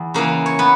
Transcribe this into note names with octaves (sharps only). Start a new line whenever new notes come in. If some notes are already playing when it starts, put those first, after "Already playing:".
Already playing: E2
C#3 E3 A#3 A#4
C#5
B3 B4